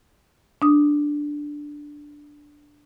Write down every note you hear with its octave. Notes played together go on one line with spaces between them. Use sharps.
D4 D#6